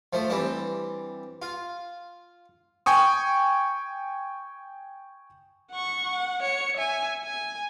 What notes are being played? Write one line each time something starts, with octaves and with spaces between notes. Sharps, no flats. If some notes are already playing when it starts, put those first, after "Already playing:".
F3 A3 C5
E3 G3 C4 D4
F4
G5 G#5 C#6 D#6
F#5 C#6
F#5
C#5 C#7
E5 G#5
G#5